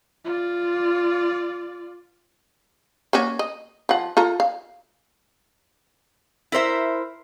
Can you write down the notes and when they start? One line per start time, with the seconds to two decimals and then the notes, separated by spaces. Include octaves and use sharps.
0.25 F4 D5
3.13 A#3 C#4 F#4
3.39 D#5
3.89 F3 F#5
4.17 F4 A4 A#5
4.40 F5
6.52 E4 A#4 C5 E5